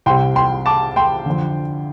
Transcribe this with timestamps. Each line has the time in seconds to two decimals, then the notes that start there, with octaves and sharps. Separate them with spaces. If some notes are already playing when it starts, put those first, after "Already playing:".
0.06 C2 C3 G5 C6
0.36 G5 C6
0.66 A5 D6
0.96 G5 C6
1.26 F2 D3